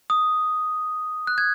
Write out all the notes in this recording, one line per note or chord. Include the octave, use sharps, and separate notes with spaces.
D#6
F#6
G#6